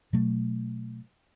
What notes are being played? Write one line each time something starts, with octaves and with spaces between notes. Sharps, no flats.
B2 F#3 A3